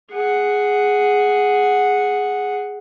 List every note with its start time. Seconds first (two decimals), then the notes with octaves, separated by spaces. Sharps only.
0.11 G#4 F#5